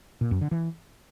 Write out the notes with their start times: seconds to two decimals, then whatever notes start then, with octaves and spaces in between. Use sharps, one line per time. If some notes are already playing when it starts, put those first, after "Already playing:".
0.21 A#2
0.31 F#2
0.41 D3
0.51 E3